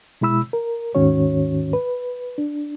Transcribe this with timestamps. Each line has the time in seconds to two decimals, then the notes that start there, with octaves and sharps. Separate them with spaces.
0.21 B2 G#3 E4 B5 E6
0.53 A#4
0.95 D#2 G#2 D#3 C#4 F#4 C#5
1.73 B4
2.38 D4